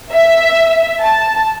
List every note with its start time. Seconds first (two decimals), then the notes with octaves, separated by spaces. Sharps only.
0.12 E5
1.01 A5